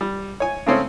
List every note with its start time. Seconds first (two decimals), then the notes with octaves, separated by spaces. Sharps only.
0.01 G3
0.40 C#5 G#5
0.67 C#3 A3 C4 C#4